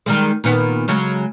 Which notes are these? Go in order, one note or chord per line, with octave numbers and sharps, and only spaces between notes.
D#3 G3 G#3
A#2 D#3 B3
C#3 F#3 G#3